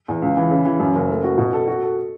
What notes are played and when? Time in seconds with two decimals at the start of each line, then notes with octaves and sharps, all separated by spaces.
0.08 E2
0.22 C#2
0.37 E3
0.51 C#3
0.65 E3
0.80 F#2
0.95 F#1
1.10 A3
1.24 F#4
1.38 B2
1.53 A4
1.68 F#4
1.82 A4